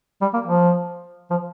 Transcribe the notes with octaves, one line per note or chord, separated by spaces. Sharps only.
G3
A#3
F3
F3